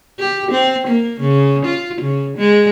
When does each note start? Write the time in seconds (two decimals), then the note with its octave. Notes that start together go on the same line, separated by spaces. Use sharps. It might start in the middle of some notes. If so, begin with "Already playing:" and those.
0.19 G4
0.51 C4
0.87 A#3
1.20 C#3
1.65 F4
2.01 C#3
2.38 G#3